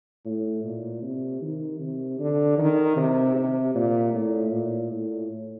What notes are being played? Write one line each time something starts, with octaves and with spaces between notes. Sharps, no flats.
A2
A#2
C3
D#3
C3
D3
D#3
C3
C3
A#2
A2
A#2
A2